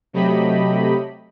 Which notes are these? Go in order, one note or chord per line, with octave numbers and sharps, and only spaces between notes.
C3 F#3 A3 G4 D#5 B5